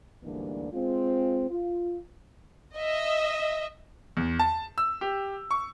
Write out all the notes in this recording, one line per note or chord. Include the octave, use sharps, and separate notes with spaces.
D2 G#2 E3 G3 A#3 D4
G#3 C4 F4
F4
D#5 E5
E2
A5
E6
G4
C#6